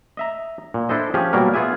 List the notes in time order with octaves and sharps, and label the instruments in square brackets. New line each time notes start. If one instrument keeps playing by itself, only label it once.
[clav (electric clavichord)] D#5 E5 A#5
A#2
D4 E4 A4 C5 D#5
F3 C#4 G4 G#4
B2 F#3 G3 A#3 A#4
B3 F4 G#4 E5 G#5